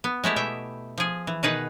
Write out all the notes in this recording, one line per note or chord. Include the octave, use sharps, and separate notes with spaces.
B3
G#3 A3 E4 G4
B2 E5 G5
F3 G#4
E3
B2 D#3 D#4 G#4 B4 F#5